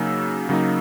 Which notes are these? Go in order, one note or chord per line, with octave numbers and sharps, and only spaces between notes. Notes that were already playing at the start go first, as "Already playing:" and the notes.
Already playing: C#3 F#3 A#3 D#4 E6
C#3 F#3 A#3 D#4